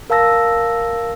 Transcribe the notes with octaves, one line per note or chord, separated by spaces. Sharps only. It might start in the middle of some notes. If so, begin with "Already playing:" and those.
A#4 F5 A5 E6 A#6